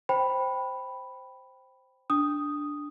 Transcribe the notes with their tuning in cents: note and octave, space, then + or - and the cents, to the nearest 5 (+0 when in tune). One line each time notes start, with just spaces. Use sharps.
C5 +0 G5 +0 B5 +0
D4 +0 D#6 +0